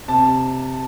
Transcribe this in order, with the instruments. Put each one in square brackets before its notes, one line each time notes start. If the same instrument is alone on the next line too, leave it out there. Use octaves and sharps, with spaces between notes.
[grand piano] C3 A5